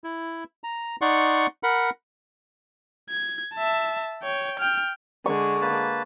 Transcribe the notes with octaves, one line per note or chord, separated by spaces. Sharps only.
E4
A#5
D#4 D5 F#5 C6 C#6
A#4 F#5 B5
G#6
E5 A5
C#5 G5
G5 F6
D3 G#3 C#6
A#3 B4 A5